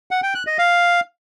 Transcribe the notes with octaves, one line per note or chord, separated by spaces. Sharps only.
F#5
G5
F#6
D#5
F5